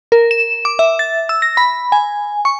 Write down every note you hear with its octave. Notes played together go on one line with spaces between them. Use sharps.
A#4
E7
D6
E5
A6
E6
A#6
B5
G#5
C#6